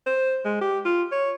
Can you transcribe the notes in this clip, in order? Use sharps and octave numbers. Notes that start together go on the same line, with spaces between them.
C5
G#3
G4
F4
C#5